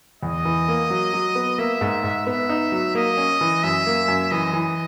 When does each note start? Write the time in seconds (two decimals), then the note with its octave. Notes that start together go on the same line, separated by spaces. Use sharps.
0.22 E2 D#5
0.45 E3
0.68 A#3
0.90 F#3
1.13 F#3
1.35 B3
1.58 A#3 E5
1.81 G#2
2.03 G#2
2.27 B3 E5
2.49 D#4
2.72 F#3
2.95 A#3 D#5
3.17 C#4
3.41 E3
3.63 F#2 E5
3.87 A#3
4.08 F#2
4.31 E3 D#5
4.54 E3